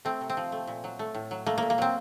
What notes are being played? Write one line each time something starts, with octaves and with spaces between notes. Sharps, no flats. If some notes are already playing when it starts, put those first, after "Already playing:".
A3 C4
C3
C4
F3
A3
A#2
F#3
A3
A2
F#3
A3 A#3
A#2 A#3
A#3
F#3 C4